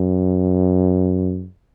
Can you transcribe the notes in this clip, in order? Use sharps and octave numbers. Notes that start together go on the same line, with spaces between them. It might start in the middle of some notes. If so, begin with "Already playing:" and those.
Already playing: F#2